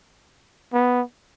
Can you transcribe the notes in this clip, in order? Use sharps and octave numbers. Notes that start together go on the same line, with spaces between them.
B3